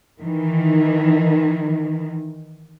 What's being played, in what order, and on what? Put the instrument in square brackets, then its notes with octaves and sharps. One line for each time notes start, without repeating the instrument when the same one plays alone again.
[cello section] D#3 E3